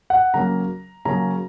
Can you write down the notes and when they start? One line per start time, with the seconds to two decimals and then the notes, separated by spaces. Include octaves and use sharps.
0.10 F#5
0.34 C#3 F#3 A#3 C#4 A#5
1.05 C#3 F#3 A#3 C#4 A#5